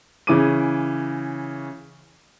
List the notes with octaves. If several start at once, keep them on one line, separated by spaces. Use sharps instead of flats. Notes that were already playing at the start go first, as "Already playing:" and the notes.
C#3 E3 C#4 G#4 D6 D#7